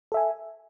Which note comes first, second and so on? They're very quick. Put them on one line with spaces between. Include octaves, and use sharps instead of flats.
A4 E5 G#5